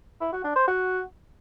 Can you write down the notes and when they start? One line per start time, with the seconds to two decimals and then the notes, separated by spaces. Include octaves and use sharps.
0.21 E4
0.32 F#4
0.44 D4
0.56 C5
0.68 F#4